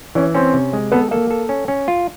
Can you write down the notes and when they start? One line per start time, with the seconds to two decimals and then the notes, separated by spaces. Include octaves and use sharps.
0.15 E3 C#4
0.34 C4 C#4
0.54 C3
0.73 G#3
0.92 B3 A4
1.11 A#3 A4
1.31 A4
1.49 C#4
1.68 C#4
1.88 F4